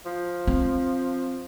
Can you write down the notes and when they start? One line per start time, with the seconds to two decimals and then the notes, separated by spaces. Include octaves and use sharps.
0.06 F3
0.47 C4